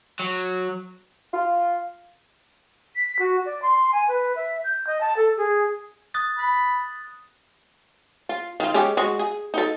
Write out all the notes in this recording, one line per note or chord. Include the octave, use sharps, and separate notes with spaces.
F#3
F4
B6
F#4
D5
C6
G#5
B4
E5
G6
D#5
A5
A4
G#4
D#6 F#6 A6
B5
F4
D#3 F4
G#3 C#4 G4
G#3 F#4
G#4
D#4 A4